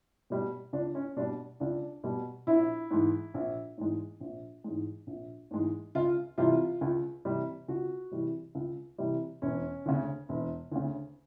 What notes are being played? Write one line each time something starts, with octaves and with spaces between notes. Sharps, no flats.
B2 G3
C#2 D4
C#4
B2 G3 D4
C#2 D4
B2 G3
A#1 E4
G#2 E3 G#3
A#1
G#2 E3 G#3
A#1
G#2 E3 G#3
A#1
G#2 E3 G#3
C#2 F4
C3 E3 G3 F4
C#2
C3 E3 G3
C#2 F#4
C3 E3 G3
C#2
C3 E3 G3
E1 C#4
D2 C#3
E1
D2 C#3